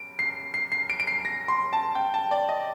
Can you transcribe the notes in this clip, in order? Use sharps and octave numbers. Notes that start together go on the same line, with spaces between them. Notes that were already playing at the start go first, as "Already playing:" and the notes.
Already playing: D7
C7
C7
C7
D7
D7
C7
A#6
C6
A5
G5
A5
D5
D#5